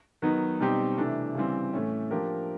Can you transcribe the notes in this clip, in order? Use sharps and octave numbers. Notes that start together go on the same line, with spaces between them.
D#3 F#3 B3 D#4
B2 G3 C4 D#4 G4
C3 E3 A3 D4
C#3 E3 G3 C4
A2 E3 A3 C#4
F3 A#3 D4 G4 A#4